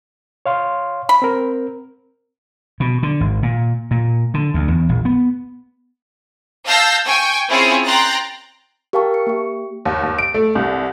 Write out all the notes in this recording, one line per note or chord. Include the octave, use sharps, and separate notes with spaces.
C#5 F5 C6
B5
C4 A#4
B2
D3
G#1
A#2
A#2
D3
D2
E2
A#1
B3
F5 A5 E6 G6 A#6 C7
G5 G#5 C#6
C4 C#4 E4 F4 G#4 C#5
G5 A#5 C6 F#6 A6
G4 A#4 F5 G5 A5 C#6
C#7
A#3 G4
D#2
D#2
D7
A3
C2